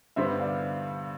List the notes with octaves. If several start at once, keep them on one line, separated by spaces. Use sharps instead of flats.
G2 D3 G3 B3 C5 E5
D5 F5